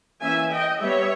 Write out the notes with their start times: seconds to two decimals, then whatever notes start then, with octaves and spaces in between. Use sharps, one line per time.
0.22 E3 A#3 C#4 E5 G#5
0.52 D#5 G5
0.81 G3 B3 C#5 E5